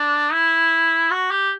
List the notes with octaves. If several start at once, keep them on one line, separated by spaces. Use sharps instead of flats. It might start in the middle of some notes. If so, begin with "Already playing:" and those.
Already playing: D4
E4
F#4
G4